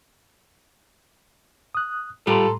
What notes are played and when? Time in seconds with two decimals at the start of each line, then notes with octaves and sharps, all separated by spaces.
1.75 D#6 F#6
2.27 A2 G3 F4 G4 A4 A#5 C6